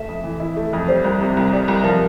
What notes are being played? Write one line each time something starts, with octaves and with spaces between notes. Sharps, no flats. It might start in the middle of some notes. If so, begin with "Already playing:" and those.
Already playing: A3 E5
F2
E3
E4
A3
F2
G3 C5
C2
C3
C2
G3
C2
F3 A#4